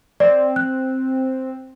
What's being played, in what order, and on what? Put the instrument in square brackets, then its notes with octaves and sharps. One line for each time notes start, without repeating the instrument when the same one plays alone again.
[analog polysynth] C4 [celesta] D5
[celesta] F#6